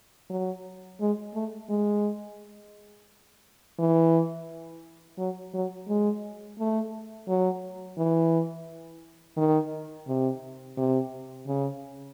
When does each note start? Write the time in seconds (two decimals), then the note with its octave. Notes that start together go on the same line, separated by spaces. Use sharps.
0.30 F#3
1.00 G#3
1.34 A3
1.69 G#3
3.79 E3
5.18 F#3
5.54 F#3
5.89 G#3
6.59 A3
7.28 F#3
7.98 E3
9.37 D#3
10.08 C3
10.78 C3
11.47 C#3